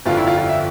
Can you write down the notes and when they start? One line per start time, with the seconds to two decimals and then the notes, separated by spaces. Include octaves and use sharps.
0.05 G1 F2 D3 F4
0.17 E4
0.27 F4
0.38 F4
0.49 E5